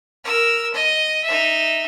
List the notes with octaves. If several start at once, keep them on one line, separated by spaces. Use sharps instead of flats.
A#4 E6
D#5
D#4 E5